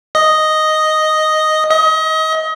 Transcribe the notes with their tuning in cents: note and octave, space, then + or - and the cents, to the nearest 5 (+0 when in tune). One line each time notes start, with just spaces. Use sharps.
D#5 +0
D#5 +30